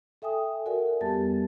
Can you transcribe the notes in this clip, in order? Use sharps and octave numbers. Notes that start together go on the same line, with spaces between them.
A4 E5 G5 G#5 D#6
F#4 A#4 D5 E5 F#5 G#5
F2 G3 B3 G4 A5 A6
F2